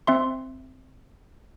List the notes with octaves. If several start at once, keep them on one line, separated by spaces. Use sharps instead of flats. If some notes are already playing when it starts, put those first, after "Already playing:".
C4 E5 C6